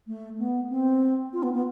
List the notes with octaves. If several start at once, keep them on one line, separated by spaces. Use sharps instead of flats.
A3
B3
C4
F4
B3
B3